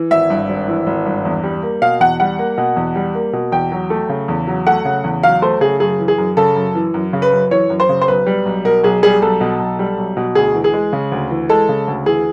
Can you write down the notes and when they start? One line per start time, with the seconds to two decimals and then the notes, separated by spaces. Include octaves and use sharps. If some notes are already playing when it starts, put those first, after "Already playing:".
Already playing: E3
0.11 G#1 E5
0.30 G2
0.49 G#1
0.68 E3
0.87 G#1
1.06 G2
1.25 E2
1.44 G3
1.63 A#3
1.82 B2 F5
2.00 E2 F#5
2.20 G3 F#5
2.39 A#3
2.58 B2
2.76 E2
2.95 G3
3.15 A#3
3.33 B2
3.52 E2 G5
3.72 F#3
3.90 A3
4.09 C#3
4.28 E2
4.47 F#3
4.66 A3 F#5
4.85 C#3
5.04 E2
5.23 F#3 F5
5.42 A3 C5
5.61 C#3 G#4
5.80 F#2 G#4
6.00 E3
6.08 G#4
6.18 F#2
6.37 C#3 A4
6.56 F#2
6.75 E3
6.94 F#2
7.13 C#3
7.22 B4
7.32 F#2
7.51 E3 C#5
7.70 F#2
7.80 C5
7.89 C#3
8.01 C5
8.08 B1 B4
8.27 G3
8.46 B1
8.65 B2 A#4
8.84 B1 G#4
9.03 G3 G#4
9.22 B1 A4
9.41 B2
9.60 B1
9.79 G3
9.98 B1
10.17 B2
10.35 D2 G#4
10.55 E3
10.64 G#4
10.74 G#3
10.93 C#3
11.12 D2
11.31 E3
11.49 G#3 A4
11.69 C#3
11.87 D2
12.06 E3 G#4